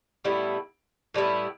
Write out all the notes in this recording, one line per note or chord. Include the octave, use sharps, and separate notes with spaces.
A2 G3 B3 E4
A2 G3 B3 E4